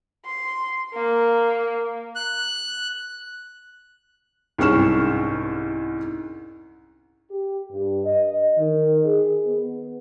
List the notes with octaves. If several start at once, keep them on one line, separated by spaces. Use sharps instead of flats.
C6
A#3
F#6
C2 G#2 C#4 C#6 F6 E7
G4
G2
D#5
D#3
G#4
B3